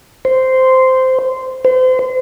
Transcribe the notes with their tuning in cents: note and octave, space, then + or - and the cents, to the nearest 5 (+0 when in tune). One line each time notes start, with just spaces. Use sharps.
C5 -10
C5 -35